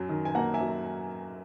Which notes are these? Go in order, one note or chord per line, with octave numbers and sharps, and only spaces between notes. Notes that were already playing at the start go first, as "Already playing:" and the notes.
Already playing: F#2 F#3
D#3
G#5
A#3 F#5 A#5
E5 G#5
F#3